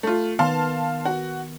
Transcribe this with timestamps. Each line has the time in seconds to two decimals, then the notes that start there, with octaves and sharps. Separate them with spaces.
0.03 A3 F4
0.39 D#3 B3 F5 A5 C6
1.05 F#4